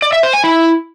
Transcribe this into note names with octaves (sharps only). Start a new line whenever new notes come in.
D5
E5
C5
G#5
E4